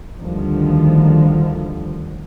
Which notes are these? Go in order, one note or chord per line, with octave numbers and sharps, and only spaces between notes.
D2 D3 D#3 F3 G3